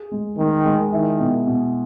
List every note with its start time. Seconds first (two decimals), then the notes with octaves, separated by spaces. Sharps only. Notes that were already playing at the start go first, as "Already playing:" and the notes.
Already playing: G#4
0.11 G#3
0.37 D#3 G#3
0.65 G#3
0.92 D#3 E4
1.19 B2
1.47 B2